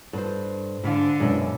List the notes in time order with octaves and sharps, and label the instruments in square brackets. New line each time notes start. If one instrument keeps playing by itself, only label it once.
[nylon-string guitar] G2 [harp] A4 C5
[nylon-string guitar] G#2 [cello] D3 [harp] E4 F5
[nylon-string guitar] F#2 B2 E5 [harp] G#3 D5